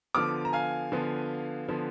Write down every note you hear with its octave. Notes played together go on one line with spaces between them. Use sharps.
D3 F3 B3 D6 F6
A#5
F5 G#5
D3 F3 B3
D3 F3 B3